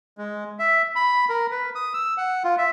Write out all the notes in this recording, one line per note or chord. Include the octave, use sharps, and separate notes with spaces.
G#3
E5
B5
A#4
B4
D#6
E6
F#5
F4
E5